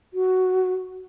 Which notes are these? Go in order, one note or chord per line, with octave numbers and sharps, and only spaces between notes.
F#4